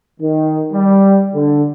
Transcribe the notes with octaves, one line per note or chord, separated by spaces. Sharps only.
D#3
G3
D3